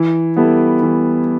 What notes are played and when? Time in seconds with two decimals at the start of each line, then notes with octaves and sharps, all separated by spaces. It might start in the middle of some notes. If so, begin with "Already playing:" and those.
Already playing: E3
0.37 G3 B3 E4 A4
0.83 E3